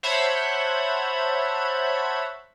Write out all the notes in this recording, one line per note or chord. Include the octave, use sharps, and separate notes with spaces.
C5 C#5 E5 F#5 A5 B5